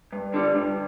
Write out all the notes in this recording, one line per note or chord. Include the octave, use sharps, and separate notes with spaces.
G2
D3 G3
G2